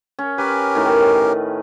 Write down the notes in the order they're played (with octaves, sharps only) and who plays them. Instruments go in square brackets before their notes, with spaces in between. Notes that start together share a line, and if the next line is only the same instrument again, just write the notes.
[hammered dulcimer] C#4
[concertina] C#4 G4 A#4 [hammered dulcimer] B4
[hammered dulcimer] A2 D#3